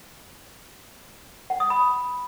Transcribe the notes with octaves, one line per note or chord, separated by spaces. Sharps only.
F#5
D#6
B5